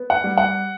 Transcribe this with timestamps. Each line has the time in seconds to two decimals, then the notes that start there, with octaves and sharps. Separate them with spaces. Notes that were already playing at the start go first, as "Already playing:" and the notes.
Already playing: B3
0.10 F#5
0.24 G3
0.37 F#5